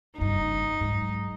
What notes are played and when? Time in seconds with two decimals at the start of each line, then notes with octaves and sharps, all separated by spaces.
0.18 F#1 G2 D#4
0.81 G#2 F#3